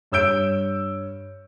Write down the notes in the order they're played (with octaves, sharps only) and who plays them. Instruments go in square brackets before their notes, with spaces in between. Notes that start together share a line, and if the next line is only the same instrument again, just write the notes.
[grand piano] G2 C#5 E6 G6 D7